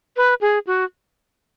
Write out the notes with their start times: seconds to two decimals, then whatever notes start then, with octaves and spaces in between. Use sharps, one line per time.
0.17 B4
0.41 G#4
0.67 F#4